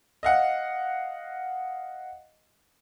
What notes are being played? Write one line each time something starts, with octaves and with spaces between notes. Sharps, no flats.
D#5 F5 F#5